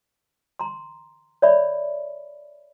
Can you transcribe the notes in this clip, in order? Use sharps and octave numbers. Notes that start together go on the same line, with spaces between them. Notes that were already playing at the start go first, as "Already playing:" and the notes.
A#5 C6
C#5 D5 E5 B5